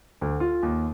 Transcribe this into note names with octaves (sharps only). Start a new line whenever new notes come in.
D2
F4
D#2